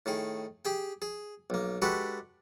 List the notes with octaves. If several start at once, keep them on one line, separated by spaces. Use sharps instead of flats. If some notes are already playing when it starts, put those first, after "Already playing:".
A2 D#3 G#4
G4 G#4 G5
G#4
B1 A#3
G#3 D4 F#4 G4 A4 B4